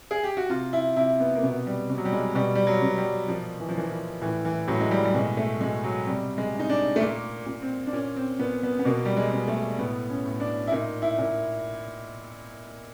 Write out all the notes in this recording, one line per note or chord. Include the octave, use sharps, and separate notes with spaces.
G#4
G4
F#4
C3 F4
E4
C3 E4
B3
A#3
B2 B3
G3
B2
F#3
G3
G#3
B2 G3
G3
F#3
B2
G3
A#2 F3
E3
F3
A#2 E3
E3
A2 E3
E3
A2 F#3
G#3
G3
G3
B2 G#3
A3
B2 G#3
F#3
C3 G3
G#3
C3
D#4
D4
A3
A#2 A#3
A#2
C4
D4
A#2 C#4
C4
A#2 B3
B3
B3
B2 A#3
G3
G#3
B2
A3
A2 B3
C#4
A2
D4
E4
A#2 D#4
E4
A#2